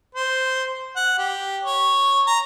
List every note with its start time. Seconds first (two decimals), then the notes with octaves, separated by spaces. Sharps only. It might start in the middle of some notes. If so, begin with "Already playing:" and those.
0.15 C5
0.96 F#5
1.18 G4
1.64 C#5
2.27 A#5